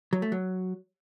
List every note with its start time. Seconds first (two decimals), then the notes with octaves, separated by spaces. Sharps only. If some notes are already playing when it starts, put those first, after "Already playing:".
0.13 F#3
0.22 A3
0.32 F#3